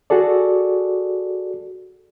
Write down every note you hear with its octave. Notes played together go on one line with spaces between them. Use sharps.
F#4 G#4 A4 D5